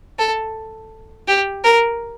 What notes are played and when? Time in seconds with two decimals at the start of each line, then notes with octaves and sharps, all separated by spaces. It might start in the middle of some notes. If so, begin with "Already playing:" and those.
0.19 A4
1.28 G4
1.64 A#4